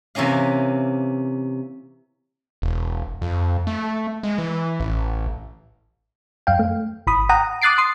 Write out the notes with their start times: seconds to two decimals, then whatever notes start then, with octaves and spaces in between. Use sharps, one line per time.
0.15 C3 E3 A#3 C#4 F5
2.62 E1
3.22 F2
3.67 A3
4.23 G#3
4.38 E3
4.80 A1
6.47 F#2 F5 G5
6.59 A3
7.07 G#1 B5 D#6
7.29 F#5 G5 A#5 D#6
7.62 D6 D#6 F#6 A6 C7 D7
7.78 C6 D#6 C7